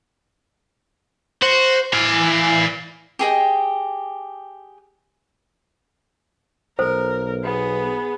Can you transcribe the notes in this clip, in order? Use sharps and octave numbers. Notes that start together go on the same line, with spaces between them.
F#4 C5
E3 D5 F5 G#5
G4 G#4 D#5 G5
B1 A4 A#4 C5
B3 G#4